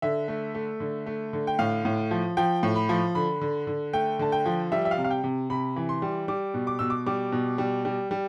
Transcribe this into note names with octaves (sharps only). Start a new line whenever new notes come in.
D3 E5
A3
A3
D3
A3
D3
G5
A2 F5
A2
F3
F3 G5
A2
B5
F3
D3 B5
D3
D3
A3 G5
D3 A5
G5
F3
G3 E5
E5
F5
C3
F5
G5
C3
C3 B5
E3
C6
G3
G3 D6
B2
D6
B2 E6
D6
G3 D6
B2
G3
G3
G3